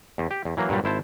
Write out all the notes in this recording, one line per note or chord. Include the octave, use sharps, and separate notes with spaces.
E2
G4
E2
E3 F#3 A#3
G2 A#2 F#3 G3
G#1 E4 C5 A5